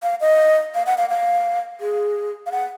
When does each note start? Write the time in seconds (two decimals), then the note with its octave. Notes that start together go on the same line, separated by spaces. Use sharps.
0.03 F5
0.21 D#5
0.75 F5
0.86 F#5
0.98 F5
1.10 F5
1.81 G#4
2.46 F5
2.52 F#5